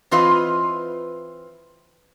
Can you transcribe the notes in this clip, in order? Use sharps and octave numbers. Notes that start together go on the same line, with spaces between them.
E3 C4 F4 B4 D#5